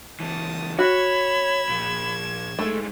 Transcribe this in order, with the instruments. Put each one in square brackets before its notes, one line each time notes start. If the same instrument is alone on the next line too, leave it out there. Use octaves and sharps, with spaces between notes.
[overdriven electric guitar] C#2 E3 [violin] A5 D#6
[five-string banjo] F#4 [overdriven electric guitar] C#5 [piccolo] B5 [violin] G#6 E7
[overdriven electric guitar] A#2 F3
[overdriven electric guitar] G2 G#3 [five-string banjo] A3